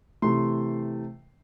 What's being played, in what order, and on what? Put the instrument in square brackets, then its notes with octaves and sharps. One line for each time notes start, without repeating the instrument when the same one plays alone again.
[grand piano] C3 E3 A3 C6